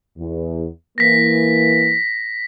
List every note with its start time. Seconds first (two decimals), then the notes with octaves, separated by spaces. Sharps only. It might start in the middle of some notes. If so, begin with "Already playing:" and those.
0.18 E2
0.98 E3 A#3 A#6 B6